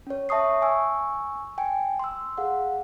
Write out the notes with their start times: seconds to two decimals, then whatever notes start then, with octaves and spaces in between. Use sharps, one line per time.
0.07 C#4 C#5
0.29 C#5 E5 A5 C#6 D#6 C7
0.62 G#5 C#6 E6
1.58 G5 G#5
1.99 C6 E6
2.38 G#4 F5 F#5